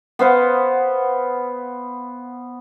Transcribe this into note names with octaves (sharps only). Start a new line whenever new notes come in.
B3 C5 F5 F#5